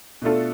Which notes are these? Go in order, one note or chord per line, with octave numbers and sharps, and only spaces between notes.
B2 A3 D4 F4 A4